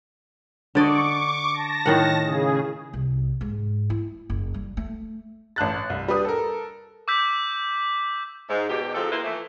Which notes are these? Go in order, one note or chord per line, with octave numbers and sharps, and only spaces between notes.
D3 D5 D#5 C#6 D6
A5 A#6
A2 D#3 F#5
C#3 G#4
C2
G#2
E4
F#1
G3
A3
A1 A5 F#6 A6
C2
G3 D4 B4 D#6
A4 A#4
D6 E6 G6 B6
G#2
E2 B2 G#3 G4
G#2 F3 C4 A4
A#3 E4 B4 C5
E3 F3 A3